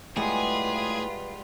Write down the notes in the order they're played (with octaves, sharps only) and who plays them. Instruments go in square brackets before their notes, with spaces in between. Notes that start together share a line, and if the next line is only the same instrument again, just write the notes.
[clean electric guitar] A2 [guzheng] G3 G#3 B3 [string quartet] F4 B4 [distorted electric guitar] G#4